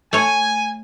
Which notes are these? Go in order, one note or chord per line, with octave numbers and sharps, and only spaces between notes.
A3 C#5 G#5